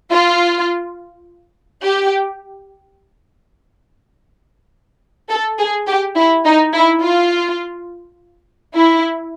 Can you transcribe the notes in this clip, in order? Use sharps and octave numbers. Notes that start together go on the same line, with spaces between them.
F4
G4
A4
G#4
G4
E4
D#4
E4
F4
E4